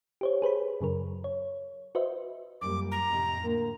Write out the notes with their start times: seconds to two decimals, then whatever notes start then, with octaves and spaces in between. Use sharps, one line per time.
0.21 G4 C5 C#5
0.42 G#4 B4 C5 B5
0.81 F#2 C#3 F#3 A#4
1.24 C#5
1.95 F#4 B4 C5 D#5 E5
2.61 F#2 A#2 G3 D6
2.92 A#5
3.10 F2 A2 C3
3.40 A2 D3 A#3